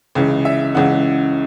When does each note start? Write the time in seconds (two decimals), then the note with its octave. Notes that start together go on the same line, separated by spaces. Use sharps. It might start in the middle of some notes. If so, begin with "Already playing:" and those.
0.15 C#2 C#3 E3
0.45 E5
0.74 C#2 C#3 E3 F#5